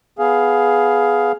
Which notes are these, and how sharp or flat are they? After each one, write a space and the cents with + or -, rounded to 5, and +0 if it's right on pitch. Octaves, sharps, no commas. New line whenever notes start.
B3 +0 G#4 +10 F5 +0